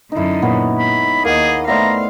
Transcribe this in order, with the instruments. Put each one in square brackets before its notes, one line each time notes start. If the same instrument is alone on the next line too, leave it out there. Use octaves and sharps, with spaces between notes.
[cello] F#2 D3 [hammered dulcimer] D#4 E4
[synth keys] A#2 A#3 [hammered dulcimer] B3 C#5
[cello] G#3 [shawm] B5
[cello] D#2 D#5 [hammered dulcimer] A#3 [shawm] G#4 [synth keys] A#4 F#5
[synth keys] A3 D5 E5 [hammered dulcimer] B3 C5 [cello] F5 [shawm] A#5